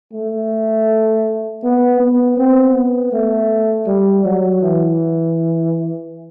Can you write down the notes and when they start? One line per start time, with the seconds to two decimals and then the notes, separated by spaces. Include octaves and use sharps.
0.13 A3
1.64 B3
2.00 B3
2.37 C4
2.74 B3
3.12 A3
3.87 G3
4.25 F#3
4.62 E3